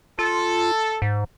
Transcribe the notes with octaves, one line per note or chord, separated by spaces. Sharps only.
F4 A4
G#2